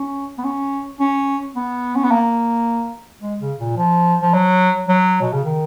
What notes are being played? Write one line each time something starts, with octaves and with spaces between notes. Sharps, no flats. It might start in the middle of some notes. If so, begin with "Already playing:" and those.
Already playing: C#4
B3
C#4
C#4
B3
C#4
B3
A#3
G#3
C#3
A#2
F3
F3
F#3
F#3
B2
C#3
D#3